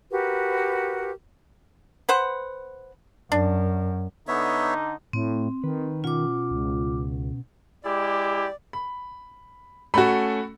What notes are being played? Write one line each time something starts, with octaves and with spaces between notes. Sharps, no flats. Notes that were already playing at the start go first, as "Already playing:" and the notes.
F#4 G4 A#4 B4
B4 C5 F#5
F#2 D4
D3 B3 D#4 C#5 E5
A2 C4
D#3 B4
B2 C#4 F4 F#5 D6
C#2
G#3 E4 G4 D5
B5
A3 C#4 F#4 A4 B5